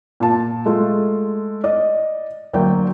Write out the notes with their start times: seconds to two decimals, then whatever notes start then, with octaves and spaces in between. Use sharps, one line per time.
0.20 A#2 A5
0.66 G#3 A3 F4
1.64 D5 D#5
2.53 D2 F#3 A#3 D5 G5